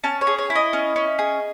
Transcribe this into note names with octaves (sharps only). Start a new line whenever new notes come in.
C#4 A5
C#5
G#4
C#5
E4
D#5
C#4
C#4
G#4